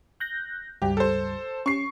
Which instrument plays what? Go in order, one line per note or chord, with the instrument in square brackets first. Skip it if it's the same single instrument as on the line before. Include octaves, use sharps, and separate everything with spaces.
[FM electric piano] F#6 G6 A#6
[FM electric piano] C#2 G2 G3 [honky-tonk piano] G4
[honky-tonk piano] A4 C5
[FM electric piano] C#4 [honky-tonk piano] C#6 C7